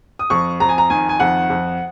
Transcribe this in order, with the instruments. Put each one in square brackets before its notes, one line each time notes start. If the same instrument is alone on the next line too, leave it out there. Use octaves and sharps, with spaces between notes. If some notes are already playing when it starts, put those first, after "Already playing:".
[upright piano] D#6
F2 C#6
F2 A#5
G#5
A#5
D#3 G#5
G#5
F2 F#5
F2